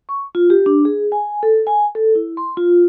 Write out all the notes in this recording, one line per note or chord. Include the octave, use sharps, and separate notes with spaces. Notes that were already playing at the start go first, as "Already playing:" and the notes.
C#6
F4
G4
D4
G#4
G#5
A4
G#5
A4
E4
C6
F4